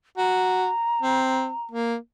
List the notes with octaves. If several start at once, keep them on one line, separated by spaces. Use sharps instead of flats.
F#4 A#5
C4
A#3